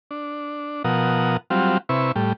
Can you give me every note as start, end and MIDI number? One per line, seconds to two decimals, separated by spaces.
0.11 0.83 62
0.84 1.37 47
0.84 1.37 53
0.84 1.37 70
0.84 1.37 78
0.84 1.37 87
1.50 1.78 54
1.50 1.78 55
1.50 1.78 60
1.50 1.78 65
1.89 2.12 48
1.89 2.12 64
1.89 2.12 71
1.89 2.12 85
2.16 2.33 45
2.16 2.33 55